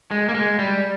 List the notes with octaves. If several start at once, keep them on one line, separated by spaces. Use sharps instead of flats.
G#3
A#3
G#3
G3